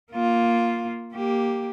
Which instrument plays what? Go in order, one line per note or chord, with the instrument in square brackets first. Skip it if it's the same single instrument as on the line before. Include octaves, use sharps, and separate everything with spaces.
[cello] A#3 F4
A#3 G4